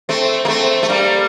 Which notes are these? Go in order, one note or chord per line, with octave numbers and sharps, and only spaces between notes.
A3 C4
A#3
A3 C4
A3
G3 A#3